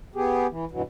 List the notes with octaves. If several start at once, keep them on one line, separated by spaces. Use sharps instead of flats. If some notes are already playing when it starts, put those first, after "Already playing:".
B3 G4 G#4
E3
G2 B2 E3 F#3